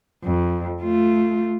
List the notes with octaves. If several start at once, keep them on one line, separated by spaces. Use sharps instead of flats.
F2
A3 F4